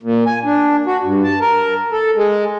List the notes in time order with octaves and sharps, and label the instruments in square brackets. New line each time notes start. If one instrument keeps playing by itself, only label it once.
[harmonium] A#2
G#5
D4
F#4
G2
A5
A#4
A4
G#3